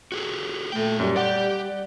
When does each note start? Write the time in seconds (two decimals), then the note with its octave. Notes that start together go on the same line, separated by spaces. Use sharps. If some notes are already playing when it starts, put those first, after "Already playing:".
0.12 F#4 G#4 A4
0.72 A#2 A3 G5
1.00 F#2 G3
1.16 G4 D5 F#5